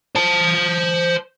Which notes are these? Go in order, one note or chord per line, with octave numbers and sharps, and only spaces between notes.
C5 A5